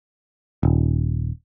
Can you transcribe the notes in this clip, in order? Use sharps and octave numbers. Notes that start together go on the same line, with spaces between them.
D#1